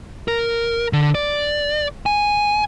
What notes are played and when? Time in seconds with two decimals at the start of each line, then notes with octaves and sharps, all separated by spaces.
0.28 A#4
0.93 D3
1.15 D5
2.06 G#5